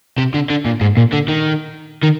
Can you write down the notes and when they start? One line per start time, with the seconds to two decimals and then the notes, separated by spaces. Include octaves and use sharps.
0.18 C3
0.34 D3
0.50 D3
0.65 A#2
0.81 G#2
0.97 A#2
1.13 D3
1.28 D#3
2.03 D#3